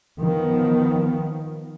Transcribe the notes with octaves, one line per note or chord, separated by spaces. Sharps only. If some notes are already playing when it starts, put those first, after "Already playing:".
D#3 F3 B3